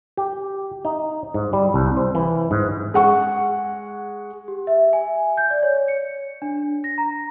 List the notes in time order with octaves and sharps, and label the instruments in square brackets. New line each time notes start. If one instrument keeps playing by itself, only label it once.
[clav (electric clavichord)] G4
D#4
G#2
G3
C2
C5
E3
G#2
[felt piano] G#3 F#5 C#6
[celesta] G4
E5
G#5
G6
D5
C#5
C#7
D4
A#6
A#5